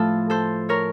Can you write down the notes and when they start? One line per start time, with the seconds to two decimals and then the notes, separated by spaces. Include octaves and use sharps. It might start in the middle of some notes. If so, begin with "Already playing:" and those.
Already playing: A2 F3 A3 F4 A4
0.30 A4 C5
0.69 A#4 C#5